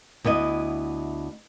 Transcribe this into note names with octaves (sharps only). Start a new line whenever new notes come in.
D2 B3 E4 D#5